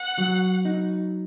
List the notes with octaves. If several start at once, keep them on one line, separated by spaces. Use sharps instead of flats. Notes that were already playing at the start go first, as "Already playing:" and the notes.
Already playing: F#5
F#3
D#4